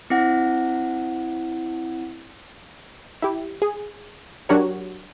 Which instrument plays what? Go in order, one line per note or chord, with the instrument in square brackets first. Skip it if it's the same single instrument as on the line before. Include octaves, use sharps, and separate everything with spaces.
[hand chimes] C4 E4 F#5
[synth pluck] E4 G4
G#4
F#3 D4 F#4 G4 A#4 C#5